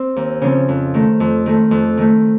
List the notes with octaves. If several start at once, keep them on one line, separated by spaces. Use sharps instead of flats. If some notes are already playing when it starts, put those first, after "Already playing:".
Already playing: C4
D#2
C#3 F3 C4
F2
D#3 A3
F2
D#3 A3
F2
D#3 A3